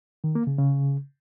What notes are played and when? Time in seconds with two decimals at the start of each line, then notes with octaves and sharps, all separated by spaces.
0.24 D#3
0.35 A#3
0.47 C#3
0.58 C#3